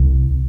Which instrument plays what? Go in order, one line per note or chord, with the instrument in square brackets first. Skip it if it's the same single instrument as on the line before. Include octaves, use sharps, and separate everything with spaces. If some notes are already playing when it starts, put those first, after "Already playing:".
Already playing: [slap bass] C2